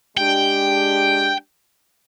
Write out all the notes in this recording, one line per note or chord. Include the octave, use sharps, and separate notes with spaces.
G#3 D4 G4 G5